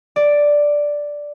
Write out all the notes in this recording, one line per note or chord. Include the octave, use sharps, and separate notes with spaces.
D5